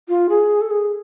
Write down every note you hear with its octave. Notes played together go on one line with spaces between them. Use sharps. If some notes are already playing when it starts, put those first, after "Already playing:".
F4
G#4
A4
G#4